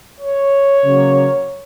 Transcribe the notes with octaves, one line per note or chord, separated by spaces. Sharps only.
C#5
C#3 F#3 A#3